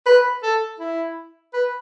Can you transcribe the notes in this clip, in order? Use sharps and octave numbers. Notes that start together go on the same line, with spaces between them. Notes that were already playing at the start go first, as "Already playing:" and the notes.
B4
A4
E4
B4